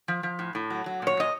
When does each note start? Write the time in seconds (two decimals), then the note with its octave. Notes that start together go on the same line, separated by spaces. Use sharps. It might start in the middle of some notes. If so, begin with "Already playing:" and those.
0.08 F3
0.23 F3
0.39 A2
0.55 A2
0.70 F#3
0.86 F#3
1.02 A#2 C#5
1.17 A#2 D#5